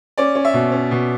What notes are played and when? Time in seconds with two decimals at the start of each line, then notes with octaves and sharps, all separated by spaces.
0.18 C#4 D5
0.35 C#4
0.45 E5
0.54 B2
0.72 C#4
0.91 B2